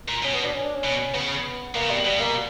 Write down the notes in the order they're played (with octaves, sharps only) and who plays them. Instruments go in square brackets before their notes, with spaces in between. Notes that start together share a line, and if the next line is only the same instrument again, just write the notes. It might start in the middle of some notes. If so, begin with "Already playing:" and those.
[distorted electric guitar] A#2
[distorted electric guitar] B2 [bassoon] C#4
[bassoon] B3
D4
C#4
D4
C#4
[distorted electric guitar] B2
[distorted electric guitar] C#3 [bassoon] B3
[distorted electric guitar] B2 [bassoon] A#3
[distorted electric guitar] C#3
[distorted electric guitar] B2 [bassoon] G3
[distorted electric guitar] B2 [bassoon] G3
[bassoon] A#3